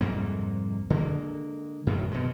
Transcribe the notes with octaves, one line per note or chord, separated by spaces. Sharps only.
C2 F2 G#2 A#3
D3 G#3 A#3
F#2 A2 D#3 F#3
B2 G#3